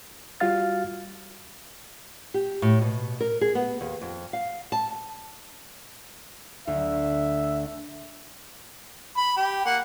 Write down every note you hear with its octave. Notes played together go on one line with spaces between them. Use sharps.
G3 F4 F#4 F5 F6 A6
G4
A2
B2
A#4
G#4
B3
D#2
F2
F5
A5
D2 E5
B5
G4
A#3 F#5